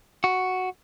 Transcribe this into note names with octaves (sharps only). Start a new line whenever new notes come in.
F#4